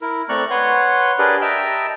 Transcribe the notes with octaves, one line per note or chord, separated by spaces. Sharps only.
E4 A#4
A3 C4 D5 A#5 C#6 F#6
B4 C#5 F#5 C6
D4 G4 G#4 A#4 B4 D5
D#5 E5 G5 A5 A#5